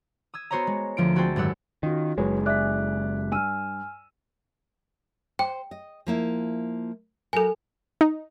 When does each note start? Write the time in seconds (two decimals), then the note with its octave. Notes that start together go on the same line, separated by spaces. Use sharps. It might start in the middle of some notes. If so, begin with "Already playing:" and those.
0.34 D#6 E6 G#6
0.51 B3 F#4 C5 C#5 D#5 A#5
0.67 G#3
0.97 D2 F3 F4 D7
1.15 C4 F#4 G#4 A4 C5 G5
1.36 G#1 F#2 G4 F#5 E6
1.83 D#3 C#4 F4 F#4
2.18 F#1 F#3 G#3 B4 C#5
2.46 D5 E5 G#5 D6 F#6 B6
3.32 G2 G#5 E6 F6 D#7
5.39 C5 G5
5.71 D#5
6.07 F3 A#3 E4
7.33 F#3 A4 A#4 G#5
8.01 D#4